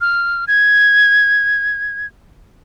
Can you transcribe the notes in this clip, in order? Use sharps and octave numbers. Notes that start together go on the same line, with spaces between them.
F6
G#6